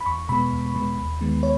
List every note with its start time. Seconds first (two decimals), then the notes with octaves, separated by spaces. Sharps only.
0.01 B5
0.06 E2 C#6
0.29 B2 G#3 B3 B5
0.52 E2
0.75 B2 G#3 B3
0.98 D#2
1.21 D#3 G#3 B3
1.43 C#5